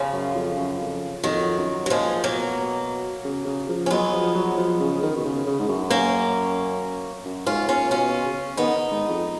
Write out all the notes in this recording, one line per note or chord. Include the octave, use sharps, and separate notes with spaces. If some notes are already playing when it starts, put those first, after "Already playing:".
Already playing: C#3 F3
F#2
F2
F#2
F2
F2 D#3 F#3
F#2
F#3
A#2 F3 G#3
B2 F#3 A#3
C#3
C#3
F3
C#4
F#3 G#3 B3
F3
F#3
F3
C#3
D#3
B2
C#3
C#3
G#2
F#2
A#3 C#4
F#2
G#2 C#4 F4
A#2 C#4 F4
B2 C#4 F4
C#3
D#3 B3 D#4
G#2
F2